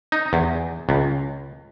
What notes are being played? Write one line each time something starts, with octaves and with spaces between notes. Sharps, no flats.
D#4
E2
C#2